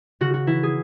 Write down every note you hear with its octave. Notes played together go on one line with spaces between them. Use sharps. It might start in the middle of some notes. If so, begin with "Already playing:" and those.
C#3 F#4
F#4
E3 E4
G#4